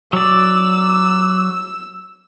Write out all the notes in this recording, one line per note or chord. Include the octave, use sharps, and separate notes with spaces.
F#3 D5 E6